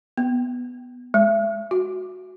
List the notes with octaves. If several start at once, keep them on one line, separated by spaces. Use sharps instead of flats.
B3
G#3
F#4